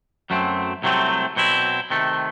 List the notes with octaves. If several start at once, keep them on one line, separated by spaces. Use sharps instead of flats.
F#2 F#3 A3 C4
C2 C3 F#3 A3 C4
B2 F#3 C4 E4
C3 D#3 A3